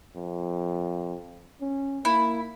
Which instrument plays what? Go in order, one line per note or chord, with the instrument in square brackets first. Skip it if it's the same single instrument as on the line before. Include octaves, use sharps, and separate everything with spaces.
[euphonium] F2
C#4
[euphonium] A#3 [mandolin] E4